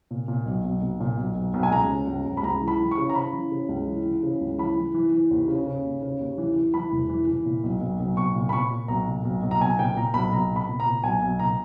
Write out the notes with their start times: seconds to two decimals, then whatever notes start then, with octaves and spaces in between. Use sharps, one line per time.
0.11 A#2
0.28 A#2
0.46 B1
0.64 B1
0.81 B1
1.00 A#2
1.17 B1
1.35 B1
1.54 B1
1.63 G#5
1.71 C#2 A#5
1.89 C#3
2.07 C#2
2.26 C#2
2.37 B5
2.43 C#2 A#5
2.61 E3
2.68 B5
2.80 E3
2.91 C#6
2.98 C#3
3.09 A#5
3.15 C#3 B5
3.33 E3
3.52 C#3
3.69 C#2
3.87 E3
4.05 E3
4.23 C#3
4.41 C#2
4.58 E3 B5
4.76 E3
4.94 E3
5.12 E3
5.31 D#2
5.48 C#3
5.67 C#3
5.85 D#2
6.02 C#3
6.19 D#2
6.38 E3
6.56 E3
6.74 E3 B5
6.92 E1
7.09 E3
7.27 E3
7.45 A#2
7.64 B1
7.81 B1
8.00 B1
8.17 B1 C#6
8.35 A#2
8.49 B5
8.53 A#2 C#6
8.71 A#2
8.88 B1 A#5
9.07 A#2
9.25 B1
9.43 B1
9.51 A#5
9.60 B1 G#5
9.79 A#2 G5
9.96 A#2 A#5
10.14 B1 B5
10.32 B1 A#5
10.50 A#2
10.56 B5
10.69 A#2
10.80 A#5
10.86 A#2
11.04 B1 G#5
11.22 B1
11.39 A#2 A#5